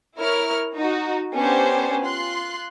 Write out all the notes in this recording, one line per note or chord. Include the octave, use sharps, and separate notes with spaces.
E4 A#4 C#5 F6
D#4 F#4
B3 C#4 D4 G4 C5
F4 C6 F#6